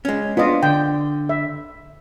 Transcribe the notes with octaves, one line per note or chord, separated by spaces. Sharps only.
G#3 C#4
B3 D4 F4 D#5
D3 G5
E5